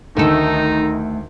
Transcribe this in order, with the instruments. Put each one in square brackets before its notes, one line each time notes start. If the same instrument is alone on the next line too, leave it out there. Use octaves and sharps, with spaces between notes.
[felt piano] D2 [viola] D#3 [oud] A3 A4 [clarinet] D#4